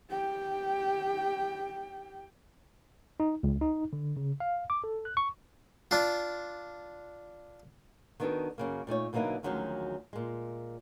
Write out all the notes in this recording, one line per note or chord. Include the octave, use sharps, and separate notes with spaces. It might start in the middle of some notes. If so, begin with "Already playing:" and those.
G4 G5
D#4
C#2
D#4
D3
C#3
F5
D6
A4
F#6
C#6
D4 F4
D#3 B3 D4 D#4 F#4 A4
F#2 C#3 A#3
A#2 A3 D#4 C#5
B2 D3 F#3 A#3 D#4 E4
D2 D#3 F3 F#3 G#3 C#4
A#2 G#3